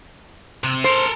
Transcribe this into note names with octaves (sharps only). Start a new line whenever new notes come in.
C3
A4 A#4 C5